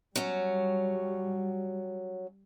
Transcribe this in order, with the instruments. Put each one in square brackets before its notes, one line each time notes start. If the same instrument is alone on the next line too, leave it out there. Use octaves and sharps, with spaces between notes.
[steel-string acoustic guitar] F#3 C#4 [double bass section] G3